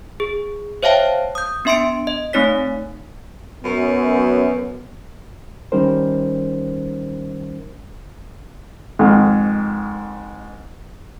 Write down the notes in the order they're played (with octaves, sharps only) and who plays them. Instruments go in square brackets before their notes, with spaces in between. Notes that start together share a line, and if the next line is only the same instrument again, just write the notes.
[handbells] G#4
C5 C#5 E5 F5 G5 A5
D#6 G6
B3 D4 E5 C6 C#7 D7
D#5
A3 C4 D#4 C#5 B6
[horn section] F#2 [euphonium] B3
[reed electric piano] D#3 G3 C#4 D#4 A#4 C5
[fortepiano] F2 G#2 D#3